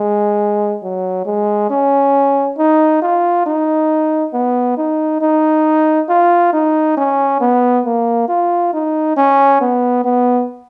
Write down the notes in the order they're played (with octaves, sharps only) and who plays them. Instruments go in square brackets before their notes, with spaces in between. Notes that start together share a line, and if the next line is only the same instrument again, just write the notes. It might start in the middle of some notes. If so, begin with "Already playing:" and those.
Already playing: [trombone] G#3
F#3
G#3
C#4
D#4
F4
D#4
B3
D#4
D#4
F4
D#4
C#4
B3
A#3
F4
D#4
C#4
B3
B3